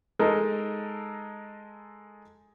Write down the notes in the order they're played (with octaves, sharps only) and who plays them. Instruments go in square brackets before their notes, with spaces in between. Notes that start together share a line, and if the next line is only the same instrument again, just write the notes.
[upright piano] G#3 D#4 A4 A#4